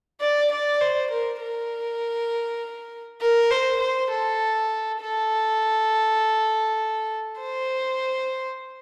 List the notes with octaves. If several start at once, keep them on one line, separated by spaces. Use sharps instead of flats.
D5
D5
C5
A#4
A#4
A#4
C5
C5
A4
A4
C5